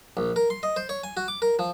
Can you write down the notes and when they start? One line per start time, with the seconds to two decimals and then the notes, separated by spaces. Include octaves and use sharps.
0.17 A#1
0.36 A#4
0.50 C6
0.63 D#5
0.76 C5
0.89 C#5
1.04 G#5
1.17 F#4
1.28 D6
1.42 A#4
1.59 F3